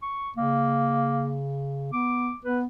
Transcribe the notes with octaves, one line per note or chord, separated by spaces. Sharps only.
C#6
C#3 A#3
B3 D6
B3 B4